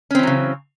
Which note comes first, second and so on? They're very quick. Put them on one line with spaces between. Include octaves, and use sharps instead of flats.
C#4 C4 E3 F#3 C#3